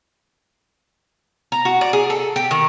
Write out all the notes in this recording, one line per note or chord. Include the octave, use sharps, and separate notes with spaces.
A#5
F#4
D5
G#4
A4
G4
D#3